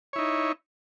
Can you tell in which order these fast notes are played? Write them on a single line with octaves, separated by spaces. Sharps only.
C#5 E4 D#4